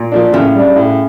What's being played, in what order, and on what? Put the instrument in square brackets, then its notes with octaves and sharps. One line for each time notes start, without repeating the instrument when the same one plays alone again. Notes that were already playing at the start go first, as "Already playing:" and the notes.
Already playing: [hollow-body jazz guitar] A#2
[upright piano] F3 A#3 D4
[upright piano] A2 [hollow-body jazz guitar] C#3
[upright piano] G3 D4
A2